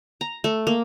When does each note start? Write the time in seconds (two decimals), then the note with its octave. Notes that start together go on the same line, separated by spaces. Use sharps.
0.21 A#5
0.44 A3
0.67 A#3